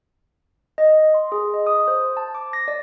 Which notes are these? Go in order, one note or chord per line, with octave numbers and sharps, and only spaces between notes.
D#5
C6
G#4
D#5
D#6
C5
A5
D6
A#6
D5